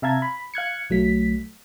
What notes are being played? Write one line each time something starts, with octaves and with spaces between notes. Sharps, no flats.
C3 E5 F5 A5 A#5 G#6
B5
F5 F#6 G#6 C#7
B1 F#3 A3 B6